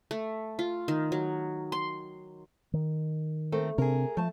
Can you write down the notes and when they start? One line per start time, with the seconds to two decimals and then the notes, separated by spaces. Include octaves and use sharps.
0.11 A3
0.59 F4
0.88 D#3
1.12 F#3
1.72 C6
2.73 D#3
3.52 A3 C4 A#4
3.78 C3 C4 D4 G#4 A#4
4.17 F3 A3 A5